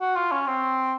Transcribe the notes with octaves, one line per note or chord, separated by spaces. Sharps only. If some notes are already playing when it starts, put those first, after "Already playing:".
F#4
F4
C#4
C4